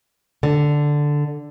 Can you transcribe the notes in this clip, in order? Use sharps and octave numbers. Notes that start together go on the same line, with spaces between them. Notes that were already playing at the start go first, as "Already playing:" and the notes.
D3